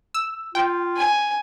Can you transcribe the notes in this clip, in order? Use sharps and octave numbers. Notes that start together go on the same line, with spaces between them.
E6
F4 G5
G#5